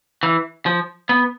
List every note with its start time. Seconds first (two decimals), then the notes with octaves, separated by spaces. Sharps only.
0.23 E3
0.66 F3
1.09 B3